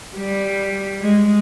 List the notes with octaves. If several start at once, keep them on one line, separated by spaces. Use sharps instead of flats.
G3
G#3